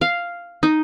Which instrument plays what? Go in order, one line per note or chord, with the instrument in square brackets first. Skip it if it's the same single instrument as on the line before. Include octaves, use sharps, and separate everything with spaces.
[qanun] F5
D#4